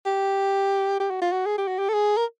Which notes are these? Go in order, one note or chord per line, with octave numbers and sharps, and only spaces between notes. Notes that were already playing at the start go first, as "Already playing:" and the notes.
G4
G4
F#4
F4
F#4
G#4
G4
F#4
G4
A4
G#4
A#4